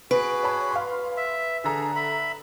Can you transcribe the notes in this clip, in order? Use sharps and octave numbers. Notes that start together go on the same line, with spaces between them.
F#4 G#4 B4 D7
C#5 A5 B5
F5 C6
E5
D3 G#4 A4 A#5
E5 B5